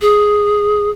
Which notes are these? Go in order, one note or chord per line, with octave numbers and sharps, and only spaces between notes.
G#4